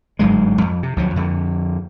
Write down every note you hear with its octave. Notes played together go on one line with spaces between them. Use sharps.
G1 G#2 F#3 G#3
F2
C3
D2 F3 F#3
F2 D3